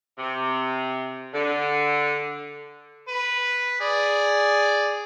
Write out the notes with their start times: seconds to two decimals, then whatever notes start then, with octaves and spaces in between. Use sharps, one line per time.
0.19 C3
1.34 D3
3.08 B4
3.81 G#4 D5